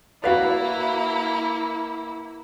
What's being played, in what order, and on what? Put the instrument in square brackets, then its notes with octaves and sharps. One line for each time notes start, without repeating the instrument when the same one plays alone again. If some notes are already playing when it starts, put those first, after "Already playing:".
[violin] A#3 E4 [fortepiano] F#4 B4 [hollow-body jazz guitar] D5 F5